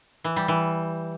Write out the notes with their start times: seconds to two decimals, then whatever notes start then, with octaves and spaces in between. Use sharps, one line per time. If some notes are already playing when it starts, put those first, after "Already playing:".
0.24 E3
0.36 G3
0.48 E3